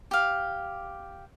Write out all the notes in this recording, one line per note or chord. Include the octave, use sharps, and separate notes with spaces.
G4 F5